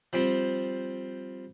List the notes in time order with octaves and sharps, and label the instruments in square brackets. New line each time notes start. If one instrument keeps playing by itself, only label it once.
[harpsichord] F3 G3 C4